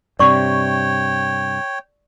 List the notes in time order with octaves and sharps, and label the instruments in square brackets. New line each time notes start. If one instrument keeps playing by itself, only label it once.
[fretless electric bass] G2 C3 [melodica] C#5 G5 [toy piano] D5 C#6